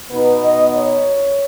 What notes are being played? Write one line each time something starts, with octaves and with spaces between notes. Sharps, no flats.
B2 B3 D#4 B4
D#5
C#5